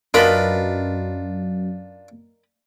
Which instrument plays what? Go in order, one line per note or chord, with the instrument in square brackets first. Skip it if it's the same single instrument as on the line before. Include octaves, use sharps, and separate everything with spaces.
[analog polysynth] F#2 [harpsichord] D4 F4 B5 [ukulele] A#4 B4 D#5